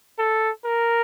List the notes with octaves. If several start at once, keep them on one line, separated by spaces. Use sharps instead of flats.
A4
A#4